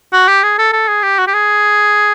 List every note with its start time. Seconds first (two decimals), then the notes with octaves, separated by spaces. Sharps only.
0.13 F#4
0.28 G4
0.43 G#4
0.59 A4
0.73 A4
0.88 G#4
1.03 G4
1.19 F#4
1.27 G4
1.33 G#4